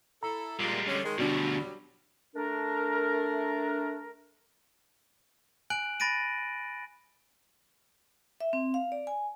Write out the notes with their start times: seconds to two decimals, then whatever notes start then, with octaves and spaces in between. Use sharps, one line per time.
0.23 E4 A4 A#5
0.60 A#2 G3 G#3
0.87 D3 C#4
1.04 D#3 G#3
1.18 D2 B2 F#3 G3 D4 F#4
2.36 A3 D4 A#4
5.70 G#5 F#6 D7 F#7
6.00 B5 A6 A#6 D7 D#7
8.40 E5
8.53 C4
8.74 F5
8.92 D5
9.07 G#5